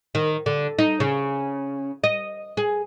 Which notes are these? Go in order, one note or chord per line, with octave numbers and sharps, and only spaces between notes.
D#3
D3
D#4
C#3
D#5
G#4